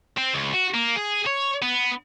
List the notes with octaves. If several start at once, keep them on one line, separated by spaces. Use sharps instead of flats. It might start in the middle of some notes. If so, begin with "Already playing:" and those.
C4
C#2
F#4
A#3
G#4
C#5
B3